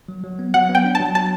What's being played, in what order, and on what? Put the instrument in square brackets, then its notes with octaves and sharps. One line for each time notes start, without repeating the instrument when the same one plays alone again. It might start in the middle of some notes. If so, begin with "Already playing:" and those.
[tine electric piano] F#3
F#3
B3
[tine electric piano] F#3 [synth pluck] F#5
[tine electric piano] B3
[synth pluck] G5
[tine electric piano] D4
[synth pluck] A5
[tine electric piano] F#3
[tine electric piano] F#3 [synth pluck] A5